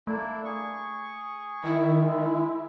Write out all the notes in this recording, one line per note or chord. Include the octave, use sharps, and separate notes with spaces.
A3 A#3 D4 E4
G#4 C#6
D#3 E4
G#3